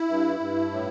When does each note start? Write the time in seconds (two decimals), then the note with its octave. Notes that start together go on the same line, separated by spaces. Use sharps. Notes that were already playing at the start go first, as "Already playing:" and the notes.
Already playing: E4
0.08 G2
0.40 G2
0.71 A2